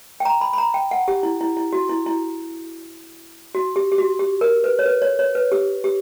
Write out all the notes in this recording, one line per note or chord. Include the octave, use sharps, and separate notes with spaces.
G5
A#5
B5
B5
A#5
G5
F#5
G4
E4
E4
E4
F#4
E4
E4
F#4
G4
G4
F#4
G4
A#4
B4
C#5
B4
C#5
C#5
B4
G4
G4